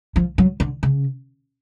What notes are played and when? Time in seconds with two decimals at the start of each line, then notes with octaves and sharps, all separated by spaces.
0.16 F3
0.38 F#3
0.60 D3
0.83 C#3